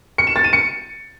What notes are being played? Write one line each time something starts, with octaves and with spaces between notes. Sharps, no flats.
C#7
E7
A6
D#7
C#7